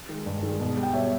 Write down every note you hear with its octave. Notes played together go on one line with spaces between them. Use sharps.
D#3 G#3
G2
D#3 G#3
B2
G3
G5
B2 C#5 E5